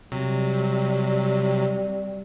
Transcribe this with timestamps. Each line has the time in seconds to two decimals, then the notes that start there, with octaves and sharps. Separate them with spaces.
0.12 C3 F#3 G3